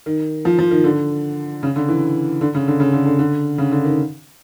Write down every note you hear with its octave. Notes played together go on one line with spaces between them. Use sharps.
D#3
F3
F3
D#3
D3
C#3
D3
E3
D3
C#3
D3
C#3
D3
D3
D3
C#3
D3
D#3